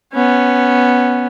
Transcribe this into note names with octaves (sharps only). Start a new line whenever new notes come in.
B3 C#4